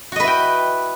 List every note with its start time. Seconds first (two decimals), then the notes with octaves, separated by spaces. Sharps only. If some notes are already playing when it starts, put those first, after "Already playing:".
0.12 F#4
0.16 D#5
0.20 B4
0.24 E4
0.27 G5